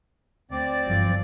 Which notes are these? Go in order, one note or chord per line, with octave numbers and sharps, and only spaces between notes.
D2 C4 D5
G1 F3